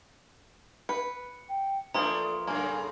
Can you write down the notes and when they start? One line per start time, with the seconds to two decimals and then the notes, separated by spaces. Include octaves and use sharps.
0.89 B4 C#7
1.49 G5
1.94 E3 F3 A3 A#3 D4 A#5 C6 D#6
2.47 F#2 A2 C#3 A#3 G#5